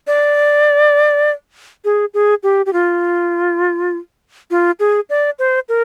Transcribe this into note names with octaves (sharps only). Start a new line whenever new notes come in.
D5
G#4
G#4
G4
G4
F4
F4
G#4
D5
C5
A#4